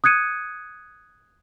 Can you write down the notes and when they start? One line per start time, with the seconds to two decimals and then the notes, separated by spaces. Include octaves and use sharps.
0.04 D#6 F#6 G#6 C#7 D#7